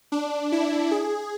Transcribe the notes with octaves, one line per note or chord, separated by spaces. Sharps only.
D4
E4
G#4